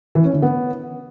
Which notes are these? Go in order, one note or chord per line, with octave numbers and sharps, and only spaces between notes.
E3
C#4
D3
B3